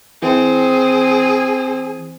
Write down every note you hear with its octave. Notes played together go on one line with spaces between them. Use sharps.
E3 C4 G#4